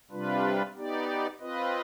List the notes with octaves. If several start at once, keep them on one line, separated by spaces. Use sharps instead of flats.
C3 G3 D4 F4 B4
B3 D#4 G4 D5
C4 F4 B4 D#5